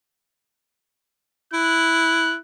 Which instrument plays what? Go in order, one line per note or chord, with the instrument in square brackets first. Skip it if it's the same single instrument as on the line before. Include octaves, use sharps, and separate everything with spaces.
[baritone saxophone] E4 [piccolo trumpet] F#6